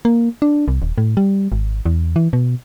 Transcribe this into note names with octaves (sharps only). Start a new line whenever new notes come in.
A#3
D4
C2
D#1
A2
G3
G#1
E2
E3
B2